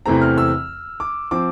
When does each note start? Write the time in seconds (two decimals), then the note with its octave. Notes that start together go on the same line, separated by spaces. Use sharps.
0.06 E2 C3 E3 A3 C4 A#5
0.22 F6
0.38 E6
1.00 D6
1.31 F3 C4 D6